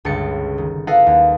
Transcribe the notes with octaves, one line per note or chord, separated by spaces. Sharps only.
G1 C#2 C#3 A6 C#7
D#3
E4 A4 B4 D#5 F5 F#5
D#2